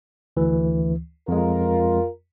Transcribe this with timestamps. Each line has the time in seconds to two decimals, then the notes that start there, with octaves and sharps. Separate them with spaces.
0.37 D2 E3
1.28 F2 G#3 F4 A#4